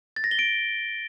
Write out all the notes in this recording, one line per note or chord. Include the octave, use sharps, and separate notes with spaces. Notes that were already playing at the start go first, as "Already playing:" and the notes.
A6
A#6
G7
D7